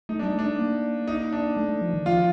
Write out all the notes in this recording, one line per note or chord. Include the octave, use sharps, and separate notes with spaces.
A3 D#4
G3 D4
A3 D4
A#3
D#4
D4
A3
A3
F3
D#3
F3 F4